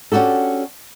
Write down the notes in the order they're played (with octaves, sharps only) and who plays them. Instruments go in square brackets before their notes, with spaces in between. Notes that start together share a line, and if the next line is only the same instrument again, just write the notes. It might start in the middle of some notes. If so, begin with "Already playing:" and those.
[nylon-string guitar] C#4 D4 F#4 G4 A4